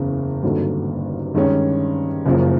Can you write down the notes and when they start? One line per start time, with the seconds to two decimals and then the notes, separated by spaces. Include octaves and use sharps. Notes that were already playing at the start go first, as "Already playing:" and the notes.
Already playing: F#1 E2 C#3
0.43 G#1 G2 D3 F#3 A#3
1.34 G2 D#3 G#3 C#4
2.26 F#1 F#2 C#3 F3 A#3